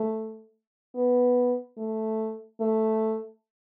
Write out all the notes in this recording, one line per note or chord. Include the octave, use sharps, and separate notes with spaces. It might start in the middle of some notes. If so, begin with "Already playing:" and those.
Already playing: A3
B3
A3
A3